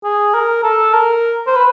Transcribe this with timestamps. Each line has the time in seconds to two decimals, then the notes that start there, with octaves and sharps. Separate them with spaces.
0.04 G#4
0.34 A#4
0.64 A4
0.94 A#4
1.47 C5
1.56 B4